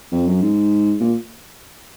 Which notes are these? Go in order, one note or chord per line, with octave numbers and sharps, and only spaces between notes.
F2
F#2
G#2
A#2